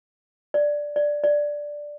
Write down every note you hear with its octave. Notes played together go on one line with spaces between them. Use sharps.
D5
D5
D5